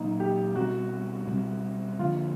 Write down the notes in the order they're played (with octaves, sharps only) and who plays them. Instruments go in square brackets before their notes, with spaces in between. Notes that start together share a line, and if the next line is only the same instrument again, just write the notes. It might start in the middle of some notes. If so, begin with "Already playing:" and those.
Already playing: [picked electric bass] A#2 F#3 A#3 [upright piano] D#4
[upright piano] G4
[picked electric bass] B2 G3 C4 [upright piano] F#4
[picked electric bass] B2 G3 C4
[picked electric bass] D3 F3 A#3 D4 [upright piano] F4